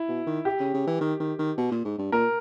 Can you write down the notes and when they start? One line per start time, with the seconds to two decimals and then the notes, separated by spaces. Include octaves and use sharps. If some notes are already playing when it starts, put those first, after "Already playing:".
Already playing: E4
0.09 B2
0.27 D#3
0.45 G4
0.60 C#3
0.74 C#3
0.87 E3
1.01 D#3
1.20 D#3
1.39 D#3
1.58 B2
1.72 A#2
1.85 G#2
1.99 G2
2.12 A#2 A#4